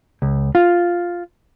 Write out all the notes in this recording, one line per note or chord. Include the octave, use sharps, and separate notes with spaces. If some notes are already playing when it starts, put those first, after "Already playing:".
C#2
F4